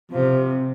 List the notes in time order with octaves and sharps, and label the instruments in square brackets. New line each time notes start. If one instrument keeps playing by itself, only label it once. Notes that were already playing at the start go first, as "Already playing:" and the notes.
[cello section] C3 [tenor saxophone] F3